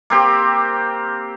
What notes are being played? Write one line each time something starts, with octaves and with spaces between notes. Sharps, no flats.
A#3 C4 G4